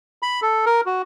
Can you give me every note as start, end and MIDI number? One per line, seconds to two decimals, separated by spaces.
0.23 0.40 83
0.42 0.65 69
0.66 0.81 70
0.86 1.02 66